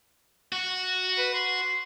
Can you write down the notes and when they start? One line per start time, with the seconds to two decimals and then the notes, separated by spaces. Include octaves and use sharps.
0.52 F#4
1.18 B4
1.34 C6